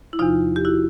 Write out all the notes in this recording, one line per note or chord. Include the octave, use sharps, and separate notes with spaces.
E4
E2 C3 F3 D#4 F4
G4
E4 F#4